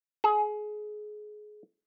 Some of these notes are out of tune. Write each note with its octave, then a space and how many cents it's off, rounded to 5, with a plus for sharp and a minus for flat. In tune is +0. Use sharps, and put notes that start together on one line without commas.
G#4 +25